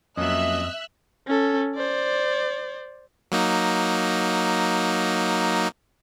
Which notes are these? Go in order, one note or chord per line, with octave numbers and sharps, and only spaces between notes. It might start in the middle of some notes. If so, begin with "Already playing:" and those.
F2 F#3 A#3 C#4 D#5 E5 E6 F#6
C#4 A4
C5 D5
F#3 A#3 D#4